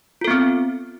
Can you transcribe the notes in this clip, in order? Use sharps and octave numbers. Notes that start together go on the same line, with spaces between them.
B3 C4 F4 A4